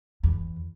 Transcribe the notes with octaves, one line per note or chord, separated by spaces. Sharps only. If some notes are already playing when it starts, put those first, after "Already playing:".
E2